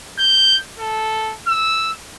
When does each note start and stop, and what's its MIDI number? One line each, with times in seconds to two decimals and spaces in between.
0.19 0.56 91
0.79 1.34 69
1.47 1.91 88